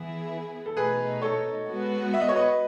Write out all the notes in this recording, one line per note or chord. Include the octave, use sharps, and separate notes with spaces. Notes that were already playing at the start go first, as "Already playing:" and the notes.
Already playing: E3 B3 E4 G#4
A4
B2 A3 D#4 G#4 B4
A4 C#5
G#3 B3 F#4
E5
D#5
C#5
B4 D#5